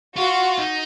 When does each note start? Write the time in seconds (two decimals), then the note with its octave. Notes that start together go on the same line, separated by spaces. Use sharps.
0.17 F4 F#4
0.59 D#4